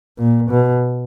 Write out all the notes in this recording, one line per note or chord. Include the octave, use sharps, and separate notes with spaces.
A#2
B2